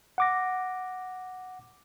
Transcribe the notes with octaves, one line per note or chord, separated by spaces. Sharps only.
F#5 D6 A#6